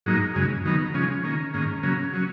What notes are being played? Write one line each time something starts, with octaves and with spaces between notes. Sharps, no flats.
G#2 F#3 A#3 D#4
F#2 C#3 G#3
D#3 F#3 B3 D#4
C#3 F3 G#3 C#4
D#3 A#3 C#4
G#2 D#3 A#3 C#4
C#3 F#3 A#3 C#4
F#3 C#4